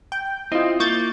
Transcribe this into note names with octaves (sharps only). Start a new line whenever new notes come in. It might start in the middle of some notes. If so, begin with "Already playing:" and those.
G5
C4 E4 F4 D#5
A#3 C#6 G6 A6